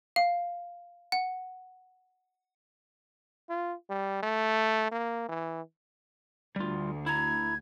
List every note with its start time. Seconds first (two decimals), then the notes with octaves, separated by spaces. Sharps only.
0.16 F5
1.12 F#5
3.49 F4
3.90 G3
4.23 A3
4.91 A#3
5.29 E3
6.56 D2 G3 F4
7.06 E4 A#5 G#6